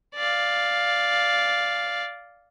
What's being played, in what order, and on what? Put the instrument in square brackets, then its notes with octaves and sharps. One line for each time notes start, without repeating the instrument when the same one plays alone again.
[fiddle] D5 F5